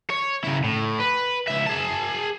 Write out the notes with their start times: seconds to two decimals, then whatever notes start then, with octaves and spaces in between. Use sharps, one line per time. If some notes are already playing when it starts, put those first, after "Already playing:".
0.10 C#5
0.44 C#3 E4
0.64 A2
0.99 B4
1.48 C#2 E5
1.67 G#4 A5